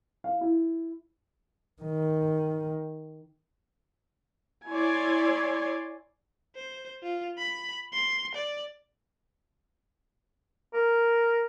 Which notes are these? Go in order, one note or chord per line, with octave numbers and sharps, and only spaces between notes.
F5
E4
D#3
E4 C#5 D5 G#5 C6
C5
F4
B5
C6
D5
A#4